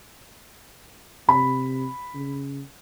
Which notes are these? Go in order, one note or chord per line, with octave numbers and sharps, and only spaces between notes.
C3 B5
C#3